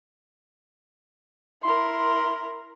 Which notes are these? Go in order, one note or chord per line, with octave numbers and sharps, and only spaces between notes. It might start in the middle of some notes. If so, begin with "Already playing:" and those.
E4 A#4 C6